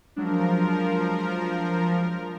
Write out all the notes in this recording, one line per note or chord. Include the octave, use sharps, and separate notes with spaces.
F3 F#3 G#3 D4 A#4